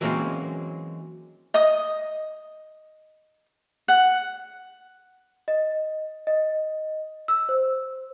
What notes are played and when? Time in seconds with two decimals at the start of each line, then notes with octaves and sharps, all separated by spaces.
0.01 E3 F#3 G#3 A#3 C4 C#4
1.54 D#5 D#6
3.88 F#5
5.48 D#5
6.27 D#5
7.28 E6
7.49 C5